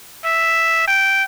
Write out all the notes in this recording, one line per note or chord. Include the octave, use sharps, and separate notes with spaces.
E5
G5